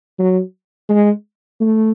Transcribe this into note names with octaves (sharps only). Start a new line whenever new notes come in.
F#3
G#3
A3